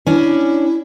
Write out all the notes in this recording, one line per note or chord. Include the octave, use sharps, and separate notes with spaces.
C#4 D4 E4